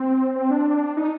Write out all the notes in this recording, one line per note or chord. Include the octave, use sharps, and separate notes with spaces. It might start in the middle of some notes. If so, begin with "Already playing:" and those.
Already playing: C4
C4
D4
D#4